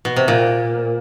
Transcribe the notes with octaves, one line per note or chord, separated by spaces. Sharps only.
B2
C3
A#2